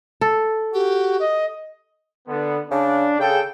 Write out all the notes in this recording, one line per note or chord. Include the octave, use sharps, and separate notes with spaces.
A4
F#4 G4
D#5
D3 B3
C#3 D4
C#3 G#4 A4 G5